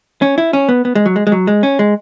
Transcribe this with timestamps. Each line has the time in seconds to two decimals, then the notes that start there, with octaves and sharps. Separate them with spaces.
0.22 C#4
0.38 E4
0.53 C#4
0.69 B3
0.85 B3
0.95 G#3
1.06 F#3
1.16 G#3
1.27 G#3
1.32 F#3
1.47 G#3
1.63 C#4
1.79 G#3